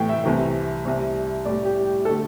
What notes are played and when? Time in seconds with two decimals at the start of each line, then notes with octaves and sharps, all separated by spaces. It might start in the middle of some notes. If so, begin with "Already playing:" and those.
Already playing: A2 E3 A3 G5
0.09 E5
0.24 C2 C3 E3 A3
0.85 C2 C3 G3
1.45 A2 G3 D5
1.65 G4
1.86 G4
2.05 D3 A3 A4